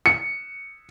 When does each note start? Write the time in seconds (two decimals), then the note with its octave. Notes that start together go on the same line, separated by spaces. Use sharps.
0.06 C#7